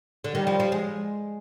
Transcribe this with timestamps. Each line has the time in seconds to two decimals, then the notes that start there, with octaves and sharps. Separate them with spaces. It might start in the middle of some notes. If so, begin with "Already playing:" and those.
0.24 D3
0.34 D#3 G3
0.47 F3
0.60 F3
0.72 G#3